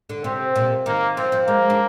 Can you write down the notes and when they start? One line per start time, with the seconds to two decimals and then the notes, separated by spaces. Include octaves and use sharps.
0.09 D3
0.24 C3 C4
0.56 A#2
0.86 D#3 A#3
1.16 F3 C4
1.32 F3
1.47 G#3 A#3
1.70 D4